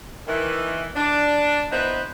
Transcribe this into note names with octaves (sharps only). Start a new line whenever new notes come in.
D#3 E3
D4
B3 D#4 E4 B4 C5